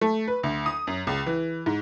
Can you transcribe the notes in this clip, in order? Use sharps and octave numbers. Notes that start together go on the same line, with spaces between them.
A3
B4
D2
D#6
F#2
C#2
E3
G#2